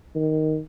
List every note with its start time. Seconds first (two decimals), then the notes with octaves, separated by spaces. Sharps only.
0.15 D#3